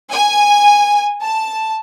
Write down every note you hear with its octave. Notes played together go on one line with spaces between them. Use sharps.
G#5
A5